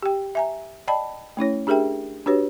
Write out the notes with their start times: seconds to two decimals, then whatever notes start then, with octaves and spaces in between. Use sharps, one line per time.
0.03 G4 G5
0.35 E5 G#5 A#5
0.88 D5 D#5 G5 A5 B5
1.37 A3 C#4 E4 C#5
1.67 D4 G4 G#4 A#4 E5 G5
2.26 D4 F#4 G4 B4 C#5